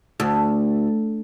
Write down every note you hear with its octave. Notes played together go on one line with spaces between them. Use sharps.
D2